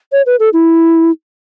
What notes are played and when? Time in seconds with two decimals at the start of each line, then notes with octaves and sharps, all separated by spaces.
0.12 C#5
0.26 B4
0.40 A4
0.53 E4